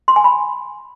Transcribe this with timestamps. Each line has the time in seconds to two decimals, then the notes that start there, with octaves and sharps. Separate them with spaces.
0.08 C6
0.16 G#5
0.24 B5